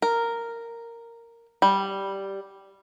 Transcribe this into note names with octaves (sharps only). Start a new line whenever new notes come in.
A#4
G3